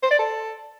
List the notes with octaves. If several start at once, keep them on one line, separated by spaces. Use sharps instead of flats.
C5
D5
A4